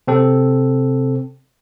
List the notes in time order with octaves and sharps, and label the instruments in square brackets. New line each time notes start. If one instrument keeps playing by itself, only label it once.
[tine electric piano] C3 C4 A4